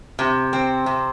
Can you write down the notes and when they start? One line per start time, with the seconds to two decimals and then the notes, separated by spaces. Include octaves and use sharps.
0.19 C3
0.53 C4
0.86 C3